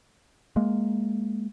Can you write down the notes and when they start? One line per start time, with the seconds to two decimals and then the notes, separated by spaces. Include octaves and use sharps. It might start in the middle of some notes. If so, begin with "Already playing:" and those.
0.56 G#3 A#3